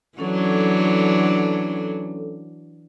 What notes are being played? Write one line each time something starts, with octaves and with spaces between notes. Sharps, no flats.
E3 F#3 C#4 D4 A4